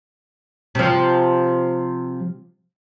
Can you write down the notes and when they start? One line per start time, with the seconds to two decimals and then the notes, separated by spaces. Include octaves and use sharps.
0.75 C3 F3